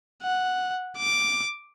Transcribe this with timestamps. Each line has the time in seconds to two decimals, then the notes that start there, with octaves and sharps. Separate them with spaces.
0.23 F#5
0.97 D6